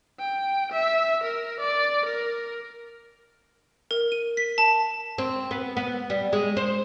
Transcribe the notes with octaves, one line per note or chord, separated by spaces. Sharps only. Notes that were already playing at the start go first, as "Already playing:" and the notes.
G5
E5
A#4
D5
A#4
A#4
D#7
B6
A5
C4
B3
B3
G3
G#3
C5